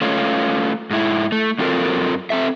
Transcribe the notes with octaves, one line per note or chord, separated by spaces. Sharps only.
A3 C#4 F4
G#2 E4
A3
F#2 C4 F4 A4 A#4
C4 A4 E5